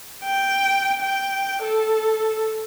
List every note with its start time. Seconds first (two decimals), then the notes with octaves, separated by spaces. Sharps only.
0.25 G5
1.02 G5
1.63 A4